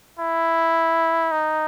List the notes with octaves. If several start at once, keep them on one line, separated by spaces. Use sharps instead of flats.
E4
D#4